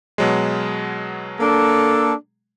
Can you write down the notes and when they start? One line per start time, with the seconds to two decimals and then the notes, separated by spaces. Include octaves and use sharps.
0.18 B2 F#3 G#3
1.40 A#3 D4 A4